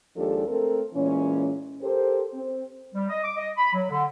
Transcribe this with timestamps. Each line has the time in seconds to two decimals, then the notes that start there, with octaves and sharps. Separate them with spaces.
0.16 D#2 F3 G#3 D4 G4 A4
0.48 A3 C4 A4 A#4
0.94 A#2 E3 G#3 C#4
1.82 G4 A4 A#4 C5
2.33 C4
2.94 G3
3.08 D#5
3.23 D6
3.36 D#5
3.57 B5
3.74 F#3
3.89 D3